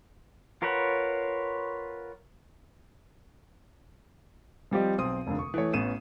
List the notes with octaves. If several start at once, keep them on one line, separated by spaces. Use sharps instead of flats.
F4 A#4 B4 C#5 F#5
F3 G3 C4 G4 D#5
B1 C4 C6 D#6
F1 D#2 D3
C#6
E3 A3 C#5
A1 B3 C#4 D#7 E7